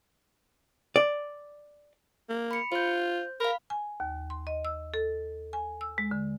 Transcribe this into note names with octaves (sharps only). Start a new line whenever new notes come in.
D5
A#3
B5 C#7
F4 C5 G6
A#4 F5 B5
G#5
D#2
C6
D#5
E6
A4
G#5
E6
G#3
D3